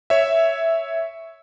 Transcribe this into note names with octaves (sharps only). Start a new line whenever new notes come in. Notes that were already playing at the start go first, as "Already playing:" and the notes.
C#5 E5